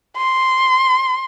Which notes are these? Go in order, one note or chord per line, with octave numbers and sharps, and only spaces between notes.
C6